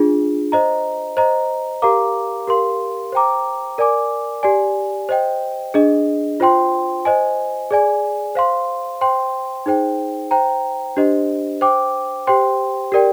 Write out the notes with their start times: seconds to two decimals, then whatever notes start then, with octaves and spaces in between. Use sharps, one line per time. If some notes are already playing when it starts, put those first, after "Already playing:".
Already playing: D4 F4 G#4
0.52 C5 D#5 A#5
1.17 C5 D#5 A#5
1.82 G4 A#4 F5 A#5 D6
2.47 G4 A#4 F5 C6
3.12 C5 G5 A#5 D6
3.78 A#4 D5 G#5 D6
4.43 G4 D5 G#5
5.09 C5 D#5 G5
5.74 D4 G#4 D#5
6.40 F4 C5 G5 C6
7.05 C5 D#5 G#5
7.71 G#4 D5 G#5
8.35 C5 F5 C6
9.01 C5 G5 C6
9.66 D#4 G#4 C5 G5
10.31 C5 G5 A#5
10.97 D4 G4 C5 D#5
11.61 C5 G5 D6
12.27 G4 C5 G5 C6
12.92 G4 A#4 D5 G5